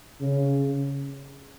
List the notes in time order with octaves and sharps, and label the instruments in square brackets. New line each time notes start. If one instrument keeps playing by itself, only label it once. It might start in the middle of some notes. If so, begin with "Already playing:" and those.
[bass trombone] C#3